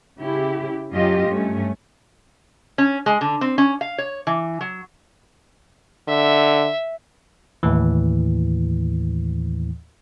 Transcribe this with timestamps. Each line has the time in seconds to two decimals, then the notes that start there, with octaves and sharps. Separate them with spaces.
0.19 C#3 E4 G4
0.91 F#2 F#3 C#4 F4 G4 D#5
1.27 G2 A3 C#4
2.78 C#4
3.06 G#3
3.21 D3
3.41 C4
3.58 C#4
3.81 F5
3.98 C#5
4.27 E3
4.61 F#3
6.08 D3 E5
7.63 D#2 A2 E3